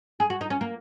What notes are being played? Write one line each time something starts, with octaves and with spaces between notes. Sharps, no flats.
G#4
F#4
D#4
C#4
A#3